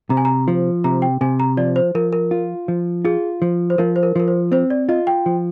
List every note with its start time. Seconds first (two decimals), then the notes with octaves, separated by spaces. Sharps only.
0.10 C3 A#5
0.17 G#5
0.25 A#5
0.48 F3
0.84 C3 A#5
1.02 G5
1.21 C3 G#5
1.40 A#5
1.57 F3 D5
1.76 C5
1.95 F3 A#4
2.13 A#4
2.31 F4
2.68 F3
3.05 F4 G#4
3.42 F3
3.70 C5
3.78 F3 A#4
3.96 C5
4.03 A#4
4.16 F3 A#4
4.28 C5
4.52 C4 C5
4.70 D5
4.89 F4 D#5
5.07 G5
5.26 F3